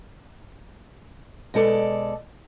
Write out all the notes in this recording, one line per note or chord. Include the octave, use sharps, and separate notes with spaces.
B2 G#3 A4 D5